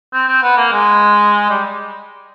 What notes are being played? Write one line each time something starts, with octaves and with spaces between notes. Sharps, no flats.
C4
C4
B3
A#3
G#3
G3